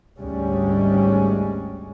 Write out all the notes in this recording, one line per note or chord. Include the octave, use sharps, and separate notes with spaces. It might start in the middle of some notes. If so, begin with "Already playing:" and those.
G#1 D2 G#2 G3 G#3 C#4